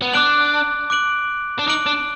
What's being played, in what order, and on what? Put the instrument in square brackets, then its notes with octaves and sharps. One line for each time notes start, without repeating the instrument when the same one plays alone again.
[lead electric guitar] B3
[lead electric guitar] D4 [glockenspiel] D6 F#6 D7 F#7
[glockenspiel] D6 F#6 D7 F#7
[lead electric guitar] D4
[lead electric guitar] D#4 [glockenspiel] D6 F#6 D7 F#7
[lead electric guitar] D4